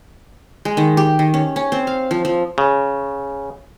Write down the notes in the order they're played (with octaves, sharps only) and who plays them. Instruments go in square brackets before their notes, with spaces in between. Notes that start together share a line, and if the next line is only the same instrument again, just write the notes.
[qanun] G#3
D#3
G4
D#3
C#4
C#4
C4
F5
F3
F3
[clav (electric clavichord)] C#3